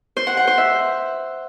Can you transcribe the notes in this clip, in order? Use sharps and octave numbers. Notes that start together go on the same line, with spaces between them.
C5
F#5
F#5
C5
E5